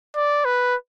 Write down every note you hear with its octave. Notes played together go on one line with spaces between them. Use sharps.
D5
B4